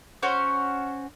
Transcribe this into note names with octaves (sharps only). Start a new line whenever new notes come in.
C#4 F#4 C5